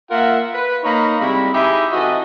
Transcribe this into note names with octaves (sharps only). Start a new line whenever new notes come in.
A#3 F4 A#4 E5 F#5
B4
A#3 D#4 C#5 A#5 B5
C3 G3 G#3 E4 B5
D#4 E4 G4 G#4 E5
E3 C4 F#4 A4 D#5